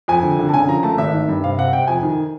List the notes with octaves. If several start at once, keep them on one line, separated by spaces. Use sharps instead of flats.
F2 G#5
D3
D3
A5
C#3 G#5
F3 A#5
A3 A5
G#1 E5
D#3
G2
C3 F5
C3 F#5
C3 G5
F2 G#5
D#3